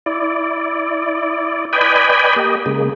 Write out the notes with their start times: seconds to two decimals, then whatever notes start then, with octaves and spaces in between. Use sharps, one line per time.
0.06 E4 D5
1.73 B4 D5 D#5 G5 G#5 B5
2.36 A#3 G4 D#5
2.66 C#3 G#3 A#3